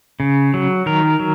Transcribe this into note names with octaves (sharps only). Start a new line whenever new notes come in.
C#3
F#3
D#3 A#4
F#3